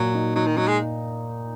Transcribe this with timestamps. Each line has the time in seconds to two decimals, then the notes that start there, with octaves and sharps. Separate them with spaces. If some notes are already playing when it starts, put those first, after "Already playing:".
Already playing: A#2 F#3
0.15 D#4
0.35 F#3 D#4
0.46 D#3
0.57 F#3 D#4
0.68 G#3